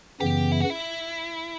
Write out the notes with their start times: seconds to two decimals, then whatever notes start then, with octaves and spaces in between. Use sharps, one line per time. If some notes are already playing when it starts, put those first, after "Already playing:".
0.20 F#2 C#3 E3 B3 G4
0.52 E4
0.61 F#4
0.70 E4